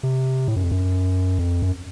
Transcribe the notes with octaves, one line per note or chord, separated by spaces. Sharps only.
C3
A2
F#2
F2
F#2
F2
F#2